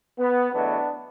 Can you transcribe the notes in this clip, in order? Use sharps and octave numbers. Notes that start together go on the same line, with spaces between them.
B3
E2 B2 F#3 A3 B3 D4